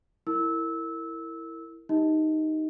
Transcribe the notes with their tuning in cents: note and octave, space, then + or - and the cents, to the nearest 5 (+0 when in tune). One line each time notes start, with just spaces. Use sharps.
E4 +0 A#4 -25 E6 -20
D#4 +0 G4 +0 D#5 +25